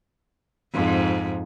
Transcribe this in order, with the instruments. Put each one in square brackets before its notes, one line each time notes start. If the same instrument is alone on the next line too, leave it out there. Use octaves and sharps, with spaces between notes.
[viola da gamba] F2 G#2